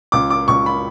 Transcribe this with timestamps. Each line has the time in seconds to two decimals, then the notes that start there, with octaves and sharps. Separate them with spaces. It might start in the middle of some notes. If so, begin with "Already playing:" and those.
0.12 C#2 D6
0.30 D6
0.48 C#2 C#6
0.66 B5